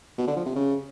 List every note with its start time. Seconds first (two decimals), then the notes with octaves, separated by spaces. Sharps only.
0.18 B2
0.27 D3
0.37 F3
0.46 C3
0.56 C#3